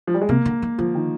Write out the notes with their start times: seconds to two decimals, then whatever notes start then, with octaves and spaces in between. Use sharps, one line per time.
0.07 F3
0.14 G3
0.21 G#3
0.29 C3 A#3
0.46 D3
0.62 D#3
0.78 D3 F3
0.95 D#3